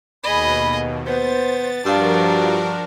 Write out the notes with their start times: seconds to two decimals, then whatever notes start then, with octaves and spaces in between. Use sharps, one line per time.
0.23 D#2 B2 G#4 D#5 B5
1.06 B3 C5 A6
1.86 G2 F3 D4 F4 F#4 A#4